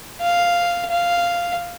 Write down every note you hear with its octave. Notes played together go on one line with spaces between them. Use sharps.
F5
F5